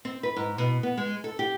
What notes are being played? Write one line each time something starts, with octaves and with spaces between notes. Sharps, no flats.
C4
B4
G#2
B2
B3
G#3
A4
G4